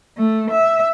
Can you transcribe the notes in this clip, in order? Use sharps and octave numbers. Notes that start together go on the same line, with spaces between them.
A3
E5